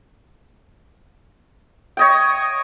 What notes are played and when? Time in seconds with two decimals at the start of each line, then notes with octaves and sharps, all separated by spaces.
1.97 C#5 D#5 G5